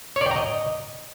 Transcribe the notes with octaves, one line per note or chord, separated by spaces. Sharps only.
C#5
D5
G5
A#5
D#5